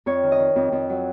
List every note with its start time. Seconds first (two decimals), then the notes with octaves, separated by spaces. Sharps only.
0.06 F2 C#5
0.23 D#3
0.32 D#5
0.39 D#3
0.56 F2
0.72 F2
0.90 F#3